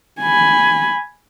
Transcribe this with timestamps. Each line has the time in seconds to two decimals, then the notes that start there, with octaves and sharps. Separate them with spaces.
0.21 G#5 B5